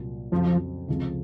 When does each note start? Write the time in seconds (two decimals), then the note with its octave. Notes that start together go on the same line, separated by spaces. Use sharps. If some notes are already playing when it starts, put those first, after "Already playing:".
Already playing: C2 A#2 F#3 A#3 F4
0.32 F2 C#3 F3 F#3 C4
0.88 C#2 C3 F3 C4